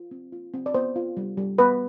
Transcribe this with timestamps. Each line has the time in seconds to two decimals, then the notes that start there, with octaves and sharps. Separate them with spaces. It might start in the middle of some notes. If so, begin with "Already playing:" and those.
Already playing: F4
0.11 C4
0.32 F4
0.54 C4
0.66 D5
0.74 B3 C5
0.96 F4
1.17 G3
1.37 G3
1.58 B3 B4